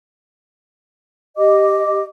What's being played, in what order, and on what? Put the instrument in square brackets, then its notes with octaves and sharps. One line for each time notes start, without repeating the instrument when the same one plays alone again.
[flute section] G4 D#5 D6